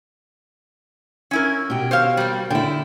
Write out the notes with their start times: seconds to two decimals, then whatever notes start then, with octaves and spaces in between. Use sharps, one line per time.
1.31 C#4 E4 A#4
1.70 B2 G4
1.91 C5 C#5 F5
2.17 G3 A#3
2.50 D3 E4 G5